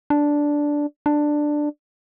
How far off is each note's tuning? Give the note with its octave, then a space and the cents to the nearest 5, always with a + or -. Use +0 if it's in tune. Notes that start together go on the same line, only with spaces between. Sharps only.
D4 -5
D4 +10